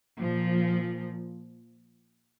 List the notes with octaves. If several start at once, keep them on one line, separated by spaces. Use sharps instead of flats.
A#2 F3